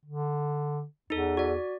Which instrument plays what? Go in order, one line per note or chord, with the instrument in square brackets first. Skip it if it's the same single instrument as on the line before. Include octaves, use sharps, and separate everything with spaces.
[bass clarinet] D3
[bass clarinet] E2 [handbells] D#4 A4
[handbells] F#4 D5